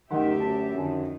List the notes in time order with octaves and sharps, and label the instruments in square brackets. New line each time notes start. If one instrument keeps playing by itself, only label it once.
[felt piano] F#1 F#5 C6 [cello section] D2 G4 E5 [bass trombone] D#3
[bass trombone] F#2 [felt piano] F#4 A5
[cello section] F2 D#3 [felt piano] D3 G#5 A5